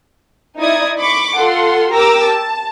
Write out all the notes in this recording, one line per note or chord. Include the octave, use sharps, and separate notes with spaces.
D#4 E4 D5 D#6 G#6
B5 C#6 D6
F4 A4 F#5 C6
G4 A#4 A#5 D6 E6
A5